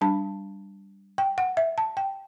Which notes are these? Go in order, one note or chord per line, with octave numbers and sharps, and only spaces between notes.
G3 D4 A5
G5
F#5
E5
A5
G5